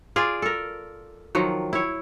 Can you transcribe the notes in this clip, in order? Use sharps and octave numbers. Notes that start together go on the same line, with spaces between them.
F4 G#4 D5
A4 A#4
D#3 F3 F#3
E4 C#5